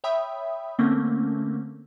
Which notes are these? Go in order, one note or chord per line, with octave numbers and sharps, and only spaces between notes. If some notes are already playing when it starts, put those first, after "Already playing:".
C#5 E5 G5 B5 D#6
D3 A3 A#3 C4 C#4